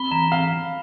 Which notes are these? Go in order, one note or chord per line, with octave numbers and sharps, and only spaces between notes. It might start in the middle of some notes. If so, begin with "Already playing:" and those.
Already playing: C4 B5
E3 A#5
C4 F5